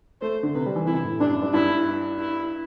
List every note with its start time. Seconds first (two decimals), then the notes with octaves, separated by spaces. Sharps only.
0.21 A3 C5
0.43 D3
0.54 C3 B4
0.66 G3
0.76 E3
0.87 C3 E4
1.04 A2
1.20 G2 D4
1.31 F#2
1.42 G2
1.54 G2 E4
2.19 E4